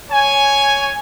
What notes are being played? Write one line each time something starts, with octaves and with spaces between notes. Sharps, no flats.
C#5 G#5